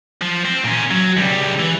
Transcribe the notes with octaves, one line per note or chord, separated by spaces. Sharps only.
F3
C4
A#2 C#4
F#3
C#2 G3
E3